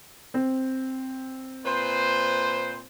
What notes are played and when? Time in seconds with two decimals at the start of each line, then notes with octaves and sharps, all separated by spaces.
0.34 C4
1.64 A#2 B4 C5